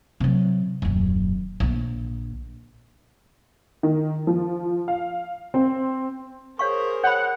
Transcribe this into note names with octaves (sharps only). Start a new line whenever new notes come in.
C3 F#3
D#1 F#2
A#1 D3
D#3
F3
F5
C4
G#4 A#4 C5 C#5 F5 C#6
C#5 F#5 B5